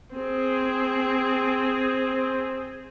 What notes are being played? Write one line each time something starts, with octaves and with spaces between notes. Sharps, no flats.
C4 G#4